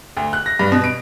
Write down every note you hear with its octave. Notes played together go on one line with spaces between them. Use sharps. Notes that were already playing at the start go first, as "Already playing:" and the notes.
D2
F#6
A#6
G2
B2
D7